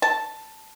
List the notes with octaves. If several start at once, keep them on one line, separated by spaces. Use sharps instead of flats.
A5